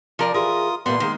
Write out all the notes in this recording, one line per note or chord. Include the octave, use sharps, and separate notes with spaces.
F3 A#4 D5
E3 F4 G#4 A#4 C5 D#6
A#2 E3 G3 A#3 B3 C6
D#3 G#3 A#3 C4